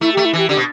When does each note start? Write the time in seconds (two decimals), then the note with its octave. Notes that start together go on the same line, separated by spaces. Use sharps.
0.01 A3 E4
0.14 G4
0.17 A3
0.25 E4
0.33 E3 G4
0.49 D3 G4
0.57 B2